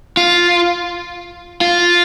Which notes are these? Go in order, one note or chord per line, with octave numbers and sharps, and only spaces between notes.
F4
F4